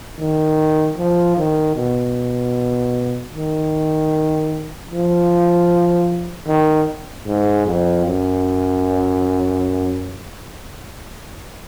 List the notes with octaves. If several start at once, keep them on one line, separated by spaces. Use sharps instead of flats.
D#3
F3
D#3
B2
D#3
F3
D#3
G#2
F2
F#2